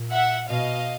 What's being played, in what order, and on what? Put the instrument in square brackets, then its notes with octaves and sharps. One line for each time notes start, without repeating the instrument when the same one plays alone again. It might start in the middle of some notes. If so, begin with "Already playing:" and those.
Already playing: [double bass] A#2
[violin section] E5 F#5
[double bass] B2 [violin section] D#5 F5